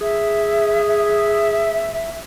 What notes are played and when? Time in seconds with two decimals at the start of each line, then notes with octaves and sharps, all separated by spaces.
0.01 G#4 E5
0.86 E5